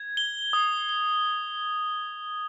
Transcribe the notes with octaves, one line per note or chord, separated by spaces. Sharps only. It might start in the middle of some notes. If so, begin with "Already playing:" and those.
Already playing: G#6
G7
D#6
G7